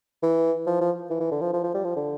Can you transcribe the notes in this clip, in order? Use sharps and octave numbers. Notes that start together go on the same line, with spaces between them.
E3
F3
F3
E3
E3
D3
F3
F3
F3
G3
F3
D3